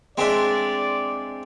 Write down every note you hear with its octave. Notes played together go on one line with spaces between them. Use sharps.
G#3 C4 D4 D5 E5 C6